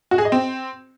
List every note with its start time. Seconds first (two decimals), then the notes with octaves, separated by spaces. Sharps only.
0.11 F#4
0.18 G#4
0.25 D#5
0.32 C4